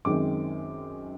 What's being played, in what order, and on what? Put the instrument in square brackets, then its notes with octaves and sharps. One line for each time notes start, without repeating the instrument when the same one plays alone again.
[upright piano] F#2 D#3 G#3 C4 D6